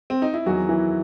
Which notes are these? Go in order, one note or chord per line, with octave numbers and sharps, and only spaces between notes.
C4
D#4
E4
E2 D#3 F#3 F#4
E3 E4